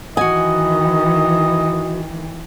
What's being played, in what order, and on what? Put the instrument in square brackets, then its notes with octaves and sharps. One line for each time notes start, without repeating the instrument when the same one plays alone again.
[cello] D#3 E3 [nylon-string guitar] F#4 G#5 [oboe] D#5